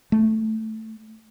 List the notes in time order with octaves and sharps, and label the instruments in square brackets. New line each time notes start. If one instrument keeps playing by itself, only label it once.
[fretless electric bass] A3